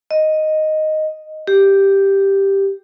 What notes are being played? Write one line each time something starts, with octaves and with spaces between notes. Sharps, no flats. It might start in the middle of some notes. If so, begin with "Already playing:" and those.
D#5
G4